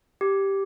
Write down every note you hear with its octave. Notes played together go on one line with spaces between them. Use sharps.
G4